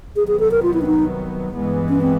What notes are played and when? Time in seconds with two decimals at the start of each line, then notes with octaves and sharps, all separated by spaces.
0.16 C2 C3 D#3 F#3 B3 G#4
0.28 G#4
0.40 A4
0.51 A#4
0.63 F4
0.74 E4
0.82 D4
0.86 D#4
1.55 G2 E3 G#3 B3
1.89 C#4
2.01 C4